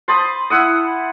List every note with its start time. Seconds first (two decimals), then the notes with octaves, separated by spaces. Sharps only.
0.08 C5 A5 B5 D#6
0.50 E4 F#5 D#6